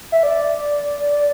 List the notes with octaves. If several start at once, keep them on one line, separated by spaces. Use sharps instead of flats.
E5
D5